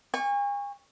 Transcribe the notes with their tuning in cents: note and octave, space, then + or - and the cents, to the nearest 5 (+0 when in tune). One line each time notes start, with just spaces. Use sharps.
G#5 -40 C#6 +0